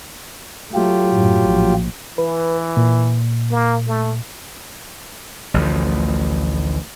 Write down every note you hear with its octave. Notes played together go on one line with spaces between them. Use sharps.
F#3 A3 F4 G4
F#2 A2
A#1
E3 B4
A#2
A#3
A3
A1 D2 F3